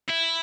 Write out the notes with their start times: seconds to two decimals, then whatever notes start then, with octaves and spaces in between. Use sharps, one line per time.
0.08 E4